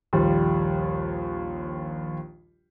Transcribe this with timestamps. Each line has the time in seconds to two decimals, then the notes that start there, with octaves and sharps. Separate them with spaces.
0.13 A#1 D#2 F3 G3 F4